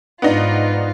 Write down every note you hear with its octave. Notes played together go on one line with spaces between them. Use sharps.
G#2 B3 D4 D#4 F4